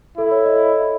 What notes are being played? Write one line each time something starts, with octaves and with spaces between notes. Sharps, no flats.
E4 A4
C#5
D#5